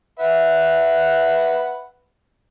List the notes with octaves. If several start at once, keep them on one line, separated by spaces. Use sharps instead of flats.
B4 E5 F#5